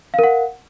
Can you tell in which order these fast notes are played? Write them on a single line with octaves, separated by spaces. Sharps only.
F5 A#4 F#5